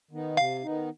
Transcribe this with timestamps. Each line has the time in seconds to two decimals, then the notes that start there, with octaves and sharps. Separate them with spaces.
0.11 D#3 B3 D#4
0.37 C3 F5
0.63 D#3 B3 D#4